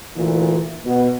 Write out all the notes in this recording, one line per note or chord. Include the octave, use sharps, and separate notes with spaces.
D2 A#2 E3
B2